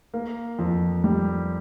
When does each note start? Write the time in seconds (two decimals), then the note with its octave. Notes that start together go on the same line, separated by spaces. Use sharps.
0.14 A#3
0.59 F2
1.04 G3